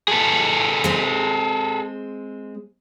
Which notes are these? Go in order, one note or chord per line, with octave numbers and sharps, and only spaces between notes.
G#4 A4 B4
G#3 C4